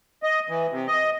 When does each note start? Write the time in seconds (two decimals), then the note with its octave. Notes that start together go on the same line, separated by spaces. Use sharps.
0.23 D#5
0.49 E3
0.70 C3
0.87 D#5